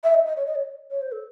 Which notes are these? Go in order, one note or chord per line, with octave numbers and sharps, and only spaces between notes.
E5
D#5
D#5
C#5
D#5
C#5
C#5
C5
A4